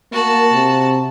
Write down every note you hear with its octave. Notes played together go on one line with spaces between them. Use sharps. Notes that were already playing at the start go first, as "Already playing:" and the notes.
A#3 F#4 A5
C3